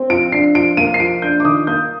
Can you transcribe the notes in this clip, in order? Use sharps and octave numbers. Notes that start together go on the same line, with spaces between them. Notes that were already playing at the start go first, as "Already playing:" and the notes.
Already playing: C4
F3 D7
D4 C7
F3 D7
A#3 D#7
C7
F3 D7
D4 G6
D6
D#3 D#6
A#3 G6